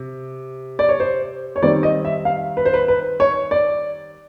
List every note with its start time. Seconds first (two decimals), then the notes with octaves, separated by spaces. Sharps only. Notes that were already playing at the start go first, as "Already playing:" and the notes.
Already playing: C3
0.79 D5
0.89 C#5
1.00 C5
1.56 C#5
1.62 D#3 G3 C4 D5
1.83 D#5
2.05 E5
2.25 F5
2.57 B4
2.65 C5
2.74 B4
2.88 B4
3.20 C#5
3.51 D5